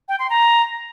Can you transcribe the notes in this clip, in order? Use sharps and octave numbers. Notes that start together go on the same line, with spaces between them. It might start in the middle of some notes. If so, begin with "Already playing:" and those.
G5
C6
A#5